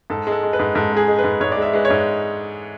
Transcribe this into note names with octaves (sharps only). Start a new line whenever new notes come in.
G#2 A4
G#3
A4
G#3
B4
G#2
G#2 A4
G#3 G#4
G#3
B4
G#2
G#2 C#5
G#3 D5
E5
G#3 B4
C#5
G#2